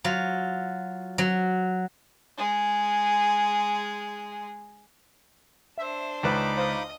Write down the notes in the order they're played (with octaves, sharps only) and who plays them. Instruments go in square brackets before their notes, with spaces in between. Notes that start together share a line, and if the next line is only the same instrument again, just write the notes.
[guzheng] F#3 F4
F#3
[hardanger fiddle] G#3 G#4
[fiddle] D4 C5 [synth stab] E5
[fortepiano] C#2 B4 [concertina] D#4 B5 D6
[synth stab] C5 F5 [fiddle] D#5